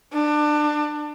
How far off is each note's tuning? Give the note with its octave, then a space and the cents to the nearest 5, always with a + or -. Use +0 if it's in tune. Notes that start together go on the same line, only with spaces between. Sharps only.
D4 +25